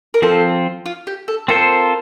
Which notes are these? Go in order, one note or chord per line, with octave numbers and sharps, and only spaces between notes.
A#4
F3 C4 F4 A4 C5
F4
G4
A4
C4 F4 A4 A#4 C5